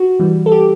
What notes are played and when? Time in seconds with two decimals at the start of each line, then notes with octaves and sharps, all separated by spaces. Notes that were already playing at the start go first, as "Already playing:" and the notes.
Already playing: F#4
0.19 E3 G3
0.46 A4
0.52 G4